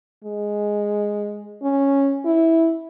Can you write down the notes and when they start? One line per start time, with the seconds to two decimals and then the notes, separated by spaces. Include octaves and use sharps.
0.24 G#3
1.63 C#4
2.25 E4